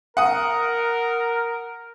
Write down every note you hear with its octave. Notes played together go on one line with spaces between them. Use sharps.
A#4 F#5 D#6